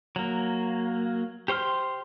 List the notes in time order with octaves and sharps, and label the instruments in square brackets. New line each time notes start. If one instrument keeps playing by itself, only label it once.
[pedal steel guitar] F#3 A#3
G4 C5 C6 F6